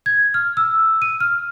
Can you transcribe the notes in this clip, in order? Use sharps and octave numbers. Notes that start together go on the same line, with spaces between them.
G#6
F6
E6
D#7
F6